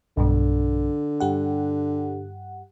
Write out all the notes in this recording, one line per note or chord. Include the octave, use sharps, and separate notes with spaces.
B1 G2 B2 D3
G2 G4 F#5